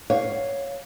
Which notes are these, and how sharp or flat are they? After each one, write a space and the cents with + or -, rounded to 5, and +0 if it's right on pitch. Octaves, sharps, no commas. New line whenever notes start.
C#5 +0 F5 +0